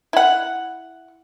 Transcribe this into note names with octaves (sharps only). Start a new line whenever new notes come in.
E4 F#5